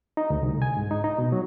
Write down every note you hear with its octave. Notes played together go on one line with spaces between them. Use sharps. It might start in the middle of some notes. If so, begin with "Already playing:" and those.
D#4
D2
C2
G#5
G#2
D#4
D#4
B2
F#3